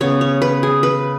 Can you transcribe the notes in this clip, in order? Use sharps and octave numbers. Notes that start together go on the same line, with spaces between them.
C#3 B3 C#5
C#5
B4
G#4
B4